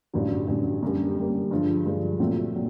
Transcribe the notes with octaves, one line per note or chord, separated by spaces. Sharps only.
A1 G2 D3 F#3
A1 G2 D3 F#3
F#2 D3 G3 A#3
F#2 D3 G3 A#3
G2 D3 F3 G#3
G2 D3 F3 G#3
A#2 F#3 A3 C4 F4
A#2 F#3